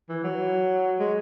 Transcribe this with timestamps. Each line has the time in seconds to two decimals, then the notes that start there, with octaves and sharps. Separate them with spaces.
0.09 E3
0.24 F#3
0.99 G#3